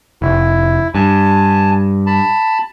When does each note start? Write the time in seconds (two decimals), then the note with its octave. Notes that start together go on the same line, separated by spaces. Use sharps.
0.22 F1 E4
0.95 G2 G#5 A5
2.06 A5 B5